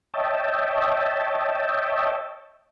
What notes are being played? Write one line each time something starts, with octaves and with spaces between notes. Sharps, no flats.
C#5 D#5 E5 G5 A5